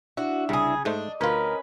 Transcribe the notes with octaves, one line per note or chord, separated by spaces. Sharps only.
D4 E4 F#4 E5
C2 C#3 G#4
G#2 A3 D4 C5 D#5
D2 C#4 F4 A#4 B4